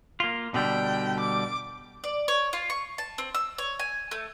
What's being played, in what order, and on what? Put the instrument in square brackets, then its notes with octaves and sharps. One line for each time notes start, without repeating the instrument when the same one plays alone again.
[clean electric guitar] A#3 F4
[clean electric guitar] B2 D3 G3 [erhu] G5
[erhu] D6
[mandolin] D5
C#5
F4
C#6
A5
C4
E6
C#5
G#5
A3